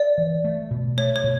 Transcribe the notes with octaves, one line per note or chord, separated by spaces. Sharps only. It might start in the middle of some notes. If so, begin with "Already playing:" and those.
Already playing: D5
E3
A3
B2
A3 C#5
C#5
B2